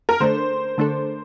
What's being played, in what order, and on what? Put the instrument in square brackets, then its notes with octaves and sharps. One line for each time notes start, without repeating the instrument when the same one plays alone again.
[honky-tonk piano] A#4
[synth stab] D3 A3 D4 A4 [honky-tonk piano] C5
[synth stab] D3 A3 D4 A4